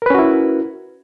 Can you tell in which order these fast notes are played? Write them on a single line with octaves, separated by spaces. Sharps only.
A#4 B4 C#4 F#4 E4